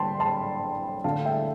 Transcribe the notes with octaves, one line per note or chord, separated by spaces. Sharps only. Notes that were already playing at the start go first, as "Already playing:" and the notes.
Already playing: D3 G3 B3 G5 A5 B5 C6
A5 C6
D3 A3 D4 F5 A5
E5 G5